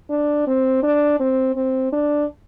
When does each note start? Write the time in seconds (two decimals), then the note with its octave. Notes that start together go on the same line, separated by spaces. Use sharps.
0.10 D4
0.47 C4
0.83 D4
1.20 C4
1.56 C4
1.92 D4